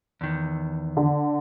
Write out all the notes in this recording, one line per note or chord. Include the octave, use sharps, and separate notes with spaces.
E2 D#3
D3